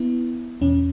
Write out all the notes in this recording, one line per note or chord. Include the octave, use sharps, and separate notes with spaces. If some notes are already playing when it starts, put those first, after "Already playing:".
Already playing: B3 E4
E2 B2 C#4